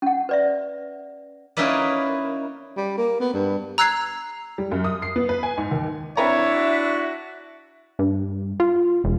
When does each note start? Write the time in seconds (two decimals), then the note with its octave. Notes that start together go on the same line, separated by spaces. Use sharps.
0.02 C#4 F#5
0.29 B4 D5 E5
1.57 A#3 C#4 D#4 E4 B4 D5
2.77 G3
2.98 A#3
3.21 B3
3.34 G2
3.78 A#5 E6 F#6 G#6 C7 F7
4.58 G3
4.71 F#2
4.84 D#6
5.02 C7
5.16 B3
5.29 B4
5.43 G#5
5.57 G#2
5.71 D#2
6.17 C4 D4 E4 B4 C#5 E5 A#5
6.54 F#4
7.99 G2
8.60 F4
9.04 E1